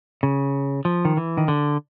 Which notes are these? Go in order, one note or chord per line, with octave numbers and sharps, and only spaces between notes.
C#3
F3
D#3
E3
D#3
D3